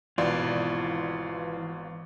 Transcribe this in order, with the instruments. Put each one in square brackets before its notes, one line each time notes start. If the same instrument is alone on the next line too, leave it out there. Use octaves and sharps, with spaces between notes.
[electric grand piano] G#1 B2 D5 [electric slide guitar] E3 F4